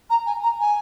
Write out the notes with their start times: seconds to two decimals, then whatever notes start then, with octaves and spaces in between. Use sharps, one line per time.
0.10 A#5
0.26 G#5
0.43 A#5
0.60 G#5